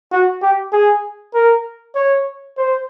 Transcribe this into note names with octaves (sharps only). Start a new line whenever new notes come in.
F#4
G4
G#4
A#4
C#5
C5